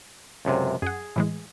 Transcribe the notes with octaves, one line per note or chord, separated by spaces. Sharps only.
C#2 F#2 C3
F#2 G#4 F#5
A2 E3 G#3